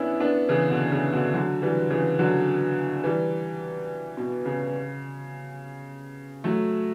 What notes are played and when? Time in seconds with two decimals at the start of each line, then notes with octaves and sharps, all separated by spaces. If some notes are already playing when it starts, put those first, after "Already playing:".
Already playing: B3 C#4 D4 E4
0.20 B3 D4
0.49 C#3 E3
0.70 B2 D3
0.92 C#3
1.13 B2 D3
1.34 D3 F#3
1.62 E3 G3
1.90 C#3 E3
2.19 D3 F#3
3.04 E3 G3
4.17 B2
4.46 C#3
6.44 F#3 A3